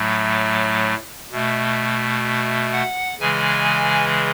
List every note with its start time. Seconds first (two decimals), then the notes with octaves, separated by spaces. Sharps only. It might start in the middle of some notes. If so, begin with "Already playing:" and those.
Already playing: A2 F#3 A3
1.32 B2 A3
2.72 F#5
3.19 C#3 E3 G#3 G#5